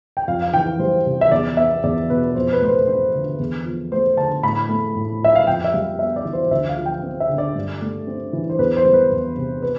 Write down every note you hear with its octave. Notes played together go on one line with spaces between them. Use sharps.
G5
F2 F5
F5
E3 G5
G3 C5
C3
E5
E2 D5
B3 E5
E2 D5
B2 B4
F2 C5
B4
A3 C5
B4
C4 C5
D3
E2
F3
A3 C5
D3 A5
A2 B5
A3
A2
F3 E5
F5
F2 G5
E5
G3 F5
B3 E5
D5
E3
C5
D2 E5
F5
F3
G5
C4
E5
D3
D5
G2
A3
C4
E3
C5
E2 B4
C5
G3
B4
E2
C3
B4